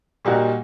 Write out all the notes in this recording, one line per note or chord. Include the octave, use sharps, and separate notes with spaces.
A#2 G3 A#3 D#4 F#4